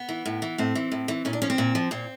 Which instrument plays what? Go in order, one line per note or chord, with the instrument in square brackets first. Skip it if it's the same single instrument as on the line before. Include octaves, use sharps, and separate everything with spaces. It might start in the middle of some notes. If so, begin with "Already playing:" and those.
Already playing: [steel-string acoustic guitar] B3
E3
A2
E3
A2 C4
E3
A2
E3
A#2 C#4
D4
F3 C#4
C4
A#2
F3
A#2 C4